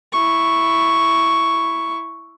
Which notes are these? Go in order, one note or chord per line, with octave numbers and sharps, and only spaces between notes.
E4 C#6